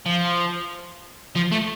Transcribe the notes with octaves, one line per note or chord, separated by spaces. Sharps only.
F3
F3
A3